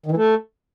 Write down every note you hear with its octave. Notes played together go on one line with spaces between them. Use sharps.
D#3
E3
A3